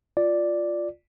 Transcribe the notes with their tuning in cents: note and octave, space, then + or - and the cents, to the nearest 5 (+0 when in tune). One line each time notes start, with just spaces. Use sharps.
F4 +0 D5 +0